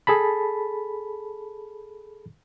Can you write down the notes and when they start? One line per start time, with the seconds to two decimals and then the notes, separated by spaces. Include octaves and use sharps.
0.07 G#4 A4 A5 B5